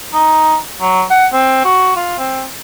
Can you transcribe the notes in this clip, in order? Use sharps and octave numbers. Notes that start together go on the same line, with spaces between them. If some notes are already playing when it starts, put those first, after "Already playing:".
D#4
F#3
F#5
C4
F#4
F4
C4